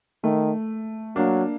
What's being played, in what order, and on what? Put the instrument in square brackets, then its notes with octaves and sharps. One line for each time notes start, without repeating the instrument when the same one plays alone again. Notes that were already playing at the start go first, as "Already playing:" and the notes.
[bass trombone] D#3 [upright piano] A3
[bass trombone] F#3 [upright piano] A#3 D4